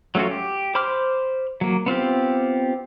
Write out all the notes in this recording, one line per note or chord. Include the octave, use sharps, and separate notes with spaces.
F#3 A3 C#4 F4 F#4
G4
C5 B5 C6 D6 F6
F#3 A#3
B3 C4 F4 G4